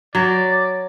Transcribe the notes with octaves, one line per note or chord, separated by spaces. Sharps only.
F#3 D5